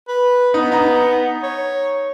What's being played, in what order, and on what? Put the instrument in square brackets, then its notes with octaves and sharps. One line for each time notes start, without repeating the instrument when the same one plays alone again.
[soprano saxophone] B4
[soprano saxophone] B3 [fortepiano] D#4
[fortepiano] D#4 A#5
[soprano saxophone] C#5